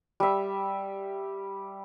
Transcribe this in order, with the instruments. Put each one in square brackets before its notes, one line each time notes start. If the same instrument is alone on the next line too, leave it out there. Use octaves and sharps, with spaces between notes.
[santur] G3 E5